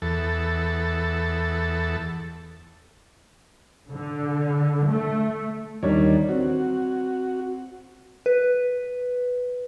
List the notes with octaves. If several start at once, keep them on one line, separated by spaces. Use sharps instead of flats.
E2 A4
D3
A3
D#2 D#3 G3 D4 C#5
C4 F#4
B4